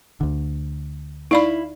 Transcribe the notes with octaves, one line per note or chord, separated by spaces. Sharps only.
D2 D3
D#4 E4 D5 F5 B5